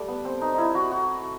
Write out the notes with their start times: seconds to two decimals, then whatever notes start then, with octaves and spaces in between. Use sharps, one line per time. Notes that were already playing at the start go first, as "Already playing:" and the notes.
Already playing: G3 A3
0.08 B3
0.25 C4
0.41 D#4
0.54 D#4 E4
0.75 F#4
0.92 F#4